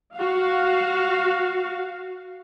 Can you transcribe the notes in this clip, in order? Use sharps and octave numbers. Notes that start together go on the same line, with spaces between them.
F#4 F5